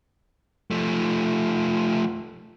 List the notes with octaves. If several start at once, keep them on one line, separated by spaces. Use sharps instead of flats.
F3 A3